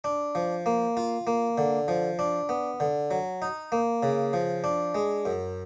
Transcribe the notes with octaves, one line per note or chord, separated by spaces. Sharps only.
D4
F3
A#3
F4
A#3
D3
F3
D4
B3
D3
F#3
D#4
A#3
C#3
F3
D4
G#3
F#2